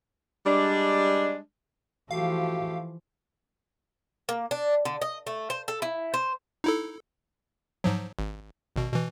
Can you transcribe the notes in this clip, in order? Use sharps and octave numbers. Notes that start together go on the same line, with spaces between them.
G3 G#3 D4
E3 F3 A3 F#4 G4 F5
A#3
D4
D3
D#5
A3
C5
A4
E4
C5
D#4 E4 A4
G#2 F3 F#3
G#1
G#1 B2
B2 E3